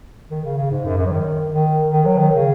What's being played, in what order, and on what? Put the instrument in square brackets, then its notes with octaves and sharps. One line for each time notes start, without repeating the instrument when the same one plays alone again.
[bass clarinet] D#3
C#3
C#3
G#2
F#2
F#2
F#3
D#3
D#3
D#3
F#3
D#3
C#3